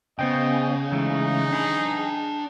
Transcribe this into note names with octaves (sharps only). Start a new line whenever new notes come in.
C#3 B3 C5 D#5 G5
E3 G#3 A3 D#4
D4 G#4 B5